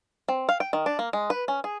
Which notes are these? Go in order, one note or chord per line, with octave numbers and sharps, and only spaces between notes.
C4
F5
G5
D#3
D4
A#3
G#3
B4
C#4
G#4